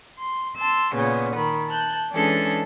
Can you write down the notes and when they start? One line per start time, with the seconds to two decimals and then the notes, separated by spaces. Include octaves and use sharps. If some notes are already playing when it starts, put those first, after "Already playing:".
0.18 C6
0.56 A5 C6 E6
0.92 A#2 C#3 B3
1.34 D#3 B5
1.68 A5 F#6 G6
2.13 E3 G#3 C#4 D4 G#4 A4